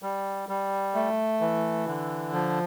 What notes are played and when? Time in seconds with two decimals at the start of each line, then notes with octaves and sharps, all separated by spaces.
0.02 G3
0.49 G3
0.94 A3
1.41 E3
1.87 D3
2.33 F3